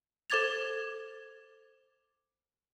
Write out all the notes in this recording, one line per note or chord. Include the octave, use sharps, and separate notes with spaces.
A4 C5 D6 G#6 A6 F7